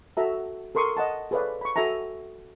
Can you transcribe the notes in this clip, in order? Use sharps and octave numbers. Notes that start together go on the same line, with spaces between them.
F#4 A4 E5 A5 A#5
A4 A#4 C6 C#6 D#6
D#5 F#5 A5
G#4 A4 B4 C#5 D5 F5
B5 C#6
F#4 A4 E5 G#5 A#5